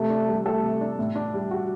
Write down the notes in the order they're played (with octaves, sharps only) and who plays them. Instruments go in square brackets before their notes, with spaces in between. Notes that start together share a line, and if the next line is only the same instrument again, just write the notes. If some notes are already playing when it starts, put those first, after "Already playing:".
Already playing: [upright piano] C3 [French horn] A3
[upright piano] D4
G3
[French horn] A3 [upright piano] A4
[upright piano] C3
D4
A2
D4
G3
F#4